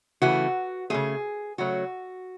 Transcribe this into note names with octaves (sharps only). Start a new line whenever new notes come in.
C#3 E3 A3 F#4
C#3 E3 A3 G#4
C#3 F#3 A3 F#4